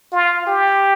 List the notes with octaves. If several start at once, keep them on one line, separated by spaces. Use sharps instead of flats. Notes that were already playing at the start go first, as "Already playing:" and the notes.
F4
G4